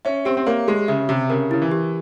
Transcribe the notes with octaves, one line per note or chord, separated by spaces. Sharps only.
C#4 E5
C4 G4
C4
A#3 C#5
G#3 G4
C#3 E5
C3 G4
C#3 A#4
C#3 E4
E3
G4